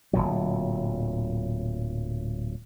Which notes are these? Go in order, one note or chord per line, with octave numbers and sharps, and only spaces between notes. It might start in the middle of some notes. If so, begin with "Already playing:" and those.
D1 G#1 A#2 F#3